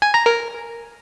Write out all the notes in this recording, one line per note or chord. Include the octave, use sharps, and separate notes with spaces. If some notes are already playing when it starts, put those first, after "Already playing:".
G#5
A#5
A#4